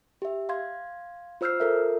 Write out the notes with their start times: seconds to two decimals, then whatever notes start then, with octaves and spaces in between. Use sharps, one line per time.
0.22 G4 E5
0.49 F5 C6 G#6
1.41 F4 C5 E6 F6 G6 C7
1.60 F4 A4 A#4 E5